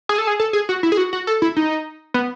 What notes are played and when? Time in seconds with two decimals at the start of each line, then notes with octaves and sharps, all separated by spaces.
0.09 G#4
0.18 A4
0.27 G#4
0.40 A4
0.53 G#4
0.69 F#4
0.83 E4
0.92 G#4
0.97 F#4
1.13 F#4
1.27 A4
1.42 E4
1.56 D#4
2.14 B3